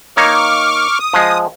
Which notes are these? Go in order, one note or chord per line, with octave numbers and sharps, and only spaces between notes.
A#3 D#4 C#5 C#6 D6 F6
D#6
F3 G#3